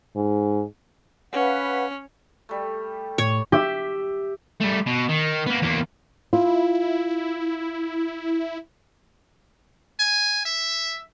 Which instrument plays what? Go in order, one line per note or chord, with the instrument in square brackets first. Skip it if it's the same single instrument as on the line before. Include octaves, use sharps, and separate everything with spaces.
[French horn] G#2
[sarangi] C#4 [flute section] B4 F5 F#5
[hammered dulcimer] G3 A3
[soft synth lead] A2 [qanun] C#5
[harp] G4 E5
[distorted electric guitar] G3 A3
B2
D#3
A#3 B3
E2 A#3
[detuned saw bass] E4 [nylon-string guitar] F4
[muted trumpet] G#5
E5